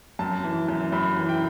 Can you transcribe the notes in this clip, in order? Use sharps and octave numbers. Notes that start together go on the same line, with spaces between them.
F#2 A5
E3
F#2
F#2 B5
E3
G5